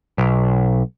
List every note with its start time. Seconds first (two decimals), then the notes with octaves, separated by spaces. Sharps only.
0.18 B1